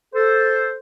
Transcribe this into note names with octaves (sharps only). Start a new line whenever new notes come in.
A4 C5